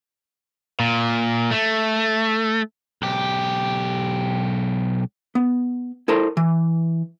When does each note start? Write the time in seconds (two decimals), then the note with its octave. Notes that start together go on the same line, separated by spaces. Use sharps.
0.80 A#2
1.51 A3
3.02 B1 G4
5.35 B3
6.08 E4 A4 A#4 C5
6.37 E3